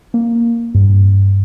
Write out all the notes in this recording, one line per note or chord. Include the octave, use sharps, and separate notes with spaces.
A#3
G2